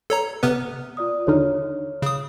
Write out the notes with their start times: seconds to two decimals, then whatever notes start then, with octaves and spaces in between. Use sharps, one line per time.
0.10 A4 C#5 A#5
0.43 C3 B3 B4 F6
0.97 F4 D5 D#6
1.27 D#2 D3 D#4 C#5 F6
2.02 C#3 D#6